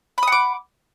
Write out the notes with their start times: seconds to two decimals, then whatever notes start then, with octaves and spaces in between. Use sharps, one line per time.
0.18 B5
0.23 D#6
0.27 F#5
0.32 D6